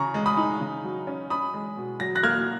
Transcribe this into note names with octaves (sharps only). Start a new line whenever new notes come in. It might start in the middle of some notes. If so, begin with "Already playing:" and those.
Already playing: C#3 A#5 C#6
G#3
B5 D#6
D#4
C#3
F#3
C#4
C#4 B5 D#6
G#3
B2
F#3 A#6
F#6 A#6
A#3 F6 G#6